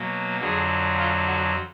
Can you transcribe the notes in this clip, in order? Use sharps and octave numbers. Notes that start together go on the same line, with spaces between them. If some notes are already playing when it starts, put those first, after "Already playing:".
Already playing: B2 F#3 A#3
F2 D3 F#3 G#4
F4
F#4